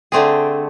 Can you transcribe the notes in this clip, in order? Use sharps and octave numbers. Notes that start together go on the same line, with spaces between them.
D3 A3 C4 G#4